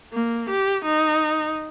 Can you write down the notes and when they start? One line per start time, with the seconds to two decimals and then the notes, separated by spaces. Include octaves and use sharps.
0.13 A#3
0.49 G4
0.85 D#4